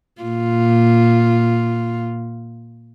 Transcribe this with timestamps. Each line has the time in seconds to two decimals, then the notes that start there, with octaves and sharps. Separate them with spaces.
0.22 A#2 F4